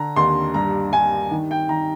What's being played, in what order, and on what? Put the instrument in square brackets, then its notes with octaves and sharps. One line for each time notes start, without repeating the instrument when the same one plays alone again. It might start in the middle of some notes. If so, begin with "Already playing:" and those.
Already playing: [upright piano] D3 A#5
D#2 C6
G2 A#5
G2 G#5
D#3
G5
D#3 A#5